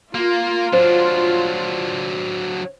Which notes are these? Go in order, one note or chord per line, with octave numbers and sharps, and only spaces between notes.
A#3 F4
F#3 D4 C5